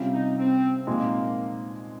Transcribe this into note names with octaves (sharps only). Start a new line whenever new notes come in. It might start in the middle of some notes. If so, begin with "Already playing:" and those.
Already playing: C3 G3 C#4 F4
D#4
C4
A#2 F3 G#3 A#3 C4 D#4